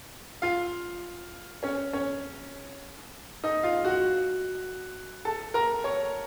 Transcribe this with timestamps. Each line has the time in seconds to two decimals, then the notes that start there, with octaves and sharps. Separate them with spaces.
0.42 F4 F5
1.63 C#4 C#5
1.93 C#4 C#5
3.44 D#4 D#5
3.63 F4 F5
3.85 F#4 F#5
5.25 A4 A5
5.54 A#4 A#5
5.84 C#5 C#6